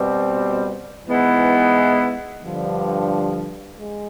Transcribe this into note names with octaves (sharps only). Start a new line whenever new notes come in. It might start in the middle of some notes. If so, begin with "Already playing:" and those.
Already playing: B2 G3 C4
G#2 E3 G#3 B3 E4
G2 D3 F3
G#3